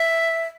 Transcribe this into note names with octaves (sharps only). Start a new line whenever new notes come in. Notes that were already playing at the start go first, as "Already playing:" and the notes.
Already playing: E5